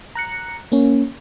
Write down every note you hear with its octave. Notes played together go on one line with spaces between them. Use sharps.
A#5 F#6 C#7
A#3 C#4